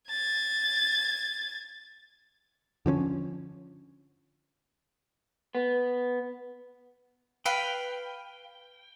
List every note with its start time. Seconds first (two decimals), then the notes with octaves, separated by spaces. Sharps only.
0.10 G#6 A6
2.86 D3 F3 C4 C#4
5.55 B3
7.46 B4 F5 G5 B5